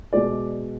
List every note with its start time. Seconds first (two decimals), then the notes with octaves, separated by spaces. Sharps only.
0.13 B2 G#3 D5